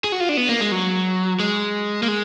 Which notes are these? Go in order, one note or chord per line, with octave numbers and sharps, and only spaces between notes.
G#4
F#4
F4
D4
B3
A#3
G#3
F#3
G#3
A#3
G#3